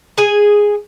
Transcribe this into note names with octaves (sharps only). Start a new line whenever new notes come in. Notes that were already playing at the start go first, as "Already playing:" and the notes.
G#4 G#5